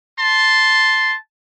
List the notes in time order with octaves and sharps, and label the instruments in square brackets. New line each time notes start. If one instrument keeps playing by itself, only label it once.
[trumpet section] A5 C6